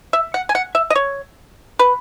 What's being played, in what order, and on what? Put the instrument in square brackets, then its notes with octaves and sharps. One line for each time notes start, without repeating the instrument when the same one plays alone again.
[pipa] E5
F#5
G#5
F#5
E5
D#5
C#5
B4